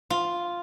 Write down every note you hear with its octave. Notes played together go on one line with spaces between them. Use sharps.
F4